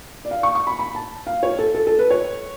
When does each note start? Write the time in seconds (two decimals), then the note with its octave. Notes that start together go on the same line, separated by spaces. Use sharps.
0.25 D5
0.31 F5
0.43 C#6
0.55 C#6
0.67 B5
0.79 B5
0.95 A5
1.27 F5
1.43 C#5
1.59 A4
1.75 A4
1.87 A4
1.99 B4
2.10 C#5